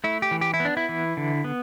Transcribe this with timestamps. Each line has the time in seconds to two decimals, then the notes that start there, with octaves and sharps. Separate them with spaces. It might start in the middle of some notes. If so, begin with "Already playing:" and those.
0.04 A3 E4
0.22 G4
0.31 E3
0.41 G4
0.54 E4
0.60 B3
0.65 D4
0.77 E4
0.89 E3
1.17 D3
1.44 B3